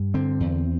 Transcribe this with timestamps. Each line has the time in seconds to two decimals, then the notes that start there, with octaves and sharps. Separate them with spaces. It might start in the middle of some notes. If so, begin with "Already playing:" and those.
Already playing: G2
0.14 D3 C4
0.40 E2